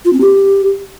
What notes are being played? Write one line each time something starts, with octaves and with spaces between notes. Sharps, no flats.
F4
C4
G4